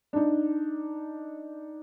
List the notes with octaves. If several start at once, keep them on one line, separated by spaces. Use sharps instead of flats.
D4 D#4